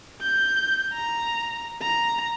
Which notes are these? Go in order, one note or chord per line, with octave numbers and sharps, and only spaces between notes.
G6
A#5
A#5